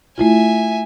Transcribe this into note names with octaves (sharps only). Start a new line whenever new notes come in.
A3 E4 F4 E5 G#5